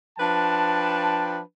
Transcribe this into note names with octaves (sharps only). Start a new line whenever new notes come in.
F3 D4 B4 G5 A5